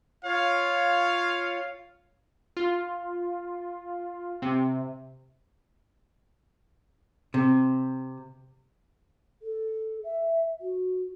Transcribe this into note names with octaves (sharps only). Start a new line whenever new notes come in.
F4 C#5 F5
F4
C3
C3
A4
E5
F#4